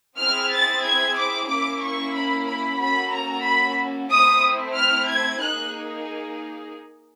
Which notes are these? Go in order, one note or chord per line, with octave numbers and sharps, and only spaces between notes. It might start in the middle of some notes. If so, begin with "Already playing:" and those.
C4 E4 G#4 F6
A6
G#6
D6
A#3 C#4 E4 D6
C#6
B5
B5
A#3 C#4 F#4 A4 B5
A#5
B5
A3 C4 E4 D#6
F6
G#6
A#3 D#4 G#4 F#6